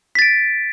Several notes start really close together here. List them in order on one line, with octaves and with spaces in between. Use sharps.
B6 A6 D7